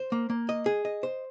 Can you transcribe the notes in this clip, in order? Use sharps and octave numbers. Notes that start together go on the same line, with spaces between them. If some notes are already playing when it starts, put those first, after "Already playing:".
Already playing: C5
A#3
A#3
D#5
G#4
D#5
C5